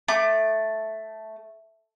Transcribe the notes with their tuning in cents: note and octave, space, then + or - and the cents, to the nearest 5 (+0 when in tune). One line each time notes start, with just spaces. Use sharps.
A3 -5 D6 +25